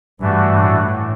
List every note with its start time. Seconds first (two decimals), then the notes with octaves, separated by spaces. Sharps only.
0.21 G2 E3 A3 D4 F#4
0.56 A2